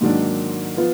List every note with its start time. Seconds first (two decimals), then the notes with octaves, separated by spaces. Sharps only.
0.01 G#2 D#3 F#3 A#3 D4
0.77 F3 B3 F4